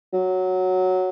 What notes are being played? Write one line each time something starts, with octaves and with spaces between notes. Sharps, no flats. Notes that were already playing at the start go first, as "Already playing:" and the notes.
F#3